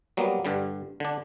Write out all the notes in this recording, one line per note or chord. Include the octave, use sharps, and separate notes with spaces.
F#3 G3 A#3 B3
G2 D3 G3
D3 D4